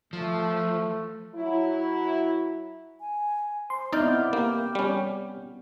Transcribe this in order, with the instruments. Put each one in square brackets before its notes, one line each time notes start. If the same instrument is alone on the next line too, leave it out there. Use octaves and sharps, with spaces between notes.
[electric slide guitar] F3 [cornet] A3
[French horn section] F#3 E4
[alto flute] G#5
[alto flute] C5 [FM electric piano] C6
[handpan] B3 C4 [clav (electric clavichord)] D#4 D5 [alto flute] E4 [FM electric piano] D6 F6 G6
[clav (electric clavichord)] A#3 [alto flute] G4
[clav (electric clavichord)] G3 C#4